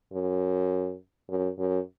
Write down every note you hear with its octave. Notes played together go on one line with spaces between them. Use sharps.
F#2
F#2
F#2